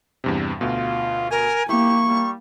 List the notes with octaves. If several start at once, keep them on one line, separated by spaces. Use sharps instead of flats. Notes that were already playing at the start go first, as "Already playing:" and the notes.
E2 G2 C3
D2 B2 F4
A#4 G#5
A#3 E4 G4 C#6
G3